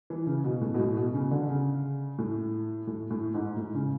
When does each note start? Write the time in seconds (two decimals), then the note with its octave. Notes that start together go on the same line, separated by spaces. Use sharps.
0.10 E3
0.26 C#3
0.44 B2
0.61 A2
0.74 B2
0.79 A2
0.97 B2
1.13 C#3
1.31 D3
1.49 C#3
2.18 A2
2.87 A2
3.10 A2
3.34 G#2
3.56 A2
3.75 C#3